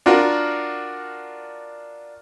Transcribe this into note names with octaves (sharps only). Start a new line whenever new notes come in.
D4 F4 F#4 A#4